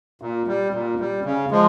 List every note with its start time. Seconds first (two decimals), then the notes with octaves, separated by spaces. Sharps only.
0.22 A#2
0.47 G3
0.74 A#2
1.00 G3
1.25 C#3
1.51 F3 G#3